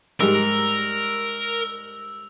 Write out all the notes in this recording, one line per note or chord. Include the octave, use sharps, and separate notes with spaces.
G#2 G3 A#4 E6 F7